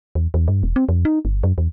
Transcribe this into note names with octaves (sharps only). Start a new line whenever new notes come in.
E2
E2
G2
E1
C4
F2
D#4
G1
F#2
E2